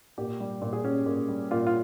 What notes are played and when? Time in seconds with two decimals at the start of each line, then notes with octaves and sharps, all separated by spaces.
0.18 A#2 G4
0.40 G3
0.62 A#2
0.73 G#4
0.84 C#4 G4
1.06 A#2
1.28 G3
1.51 A#2 F4
1.66 F4